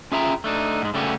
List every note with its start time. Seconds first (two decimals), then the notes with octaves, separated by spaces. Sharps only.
0.12 C#4 F4 G#4 E5 G5 A#5
0.44 A3 D4 D#4
0.82 G#2 G#3
0.94 C#3 G3 A3 C#4 F#4 G4